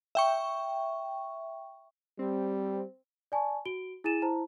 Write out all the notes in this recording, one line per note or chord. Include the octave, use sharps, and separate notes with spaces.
E5 G5 C#6
G3 C4
D5 G#5 A5 C#6
F#4 D7 G7
E4 G#4 G#5 A6 D#7 E7
E4 C5 A5 A#5